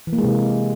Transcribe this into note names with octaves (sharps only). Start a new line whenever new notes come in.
E3
A#3
G#3
C3